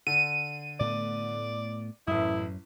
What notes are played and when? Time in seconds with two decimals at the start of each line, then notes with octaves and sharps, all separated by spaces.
0.07 D3 D#7
0.80 A2 A3 B3 D5
2.07 A1 F#2 E4 E5 D#6